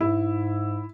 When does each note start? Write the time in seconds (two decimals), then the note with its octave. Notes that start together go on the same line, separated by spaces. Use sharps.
0.01 G#2 E4